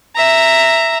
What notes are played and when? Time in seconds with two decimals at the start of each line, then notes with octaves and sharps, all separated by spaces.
0.16 E5 A#5